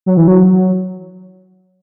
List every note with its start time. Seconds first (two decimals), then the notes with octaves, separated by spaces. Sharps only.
0.06 F#3
0.17 E3
0.28 F#3